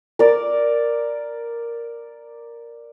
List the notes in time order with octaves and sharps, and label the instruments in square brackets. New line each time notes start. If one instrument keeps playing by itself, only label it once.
[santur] A#4 D5